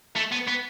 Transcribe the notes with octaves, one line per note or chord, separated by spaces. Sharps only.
A3
B3
B3